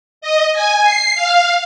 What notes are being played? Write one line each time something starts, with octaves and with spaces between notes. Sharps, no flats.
D#5
G#5
C7
F5